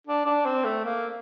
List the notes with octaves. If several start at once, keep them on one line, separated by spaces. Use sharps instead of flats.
D4
D4
C4
A3
A#3